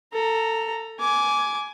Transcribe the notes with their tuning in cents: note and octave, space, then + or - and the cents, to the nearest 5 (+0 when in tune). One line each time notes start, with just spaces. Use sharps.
A4 +20 A#5 +0
G#5 +15 D6 -15